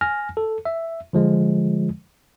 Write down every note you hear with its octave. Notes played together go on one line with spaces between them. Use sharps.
G#5 F6 A#6
A4
E5
D3 F3 G#3